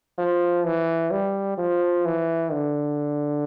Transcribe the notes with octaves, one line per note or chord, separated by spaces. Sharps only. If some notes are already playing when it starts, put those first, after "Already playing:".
F3
E3
G3
F3
E3
D3